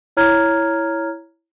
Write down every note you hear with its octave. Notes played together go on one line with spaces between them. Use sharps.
E4 C#5 A#5 F6 G#6